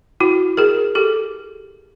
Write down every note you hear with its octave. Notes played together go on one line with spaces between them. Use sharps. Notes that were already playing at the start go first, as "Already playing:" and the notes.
E4 F#4
G#4 A#4
G4 A4